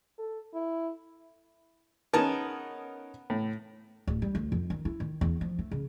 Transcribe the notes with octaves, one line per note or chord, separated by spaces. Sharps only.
A4
E4
B3 C#4 D#4 G#4 A#4 A5
A2
D1
G3
D2
F2
D#3
E4
D#3
E2
F3
A3
C#3